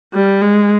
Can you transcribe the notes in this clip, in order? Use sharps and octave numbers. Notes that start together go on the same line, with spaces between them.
G3
G#3